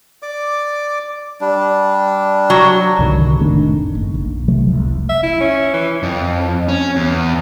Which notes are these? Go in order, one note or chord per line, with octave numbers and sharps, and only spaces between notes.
D5 D6
G3 D4
F#3
C2 G#2 D3 D#3
F1 A2 D#3 D4
F#1
A#1
C3 F3 F#3 A3
F1 C2
E5
E4
C#4
E3
F2
C#4
E2